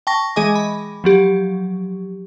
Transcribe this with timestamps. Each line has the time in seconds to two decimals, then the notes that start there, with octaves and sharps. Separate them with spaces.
0.07 G5 A5 C#6 A#6
0.36 E3 G#3 G#4 D#5 G#5 D6
0.56 B5
1.04 F3 F#3 G4